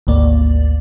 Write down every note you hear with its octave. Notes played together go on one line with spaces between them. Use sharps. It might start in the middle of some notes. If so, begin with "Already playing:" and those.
G#1 D2 A#3 D5